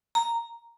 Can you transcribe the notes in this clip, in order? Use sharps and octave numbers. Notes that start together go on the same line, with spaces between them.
A#5